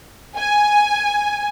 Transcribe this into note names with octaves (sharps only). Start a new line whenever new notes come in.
G#5